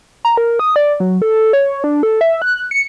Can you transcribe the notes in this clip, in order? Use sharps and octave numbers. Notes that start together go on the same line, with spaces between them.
A#5
A#4
D#6
D5
F#3
A4
C#5
D4
A4
E5
F#6
C#7